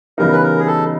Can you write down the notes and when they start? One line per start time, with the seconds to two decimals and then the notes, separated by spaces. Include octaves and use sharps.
0.18 C#3 E3 G3 B3 D#4 A#4
0.32 B4
0.43 A#4
0.59 G#4
0.67 A4